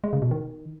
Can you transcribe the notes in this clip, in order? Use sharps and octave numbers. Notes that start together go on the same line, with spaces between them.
G#3
C#3
B2
D#3